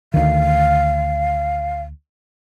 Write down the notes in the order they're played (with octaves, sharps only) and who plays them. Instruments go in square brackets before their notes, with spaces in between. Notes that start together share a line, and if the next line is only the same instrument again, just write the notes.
[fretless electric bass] D2 D#3 [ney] F5